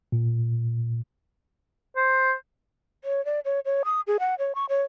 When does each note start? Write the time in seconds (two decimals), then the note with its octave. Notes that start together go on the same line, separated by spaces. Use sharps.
0.12 A#2
1.96 C5
3.04 C#5
3.25 D5
3.45 C#5
3.65 C#5
3.85 D#6
4.07 G#4
4.20 F#5
4.39 C#5
4.55 C#6
4.69 C#5